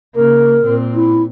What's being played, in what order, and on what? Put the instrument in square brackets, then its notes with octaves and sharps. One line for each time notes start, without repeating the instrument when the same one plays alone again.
[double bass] C#3 A#3 [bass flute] A#4
[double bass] A#2 C4
[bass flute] E4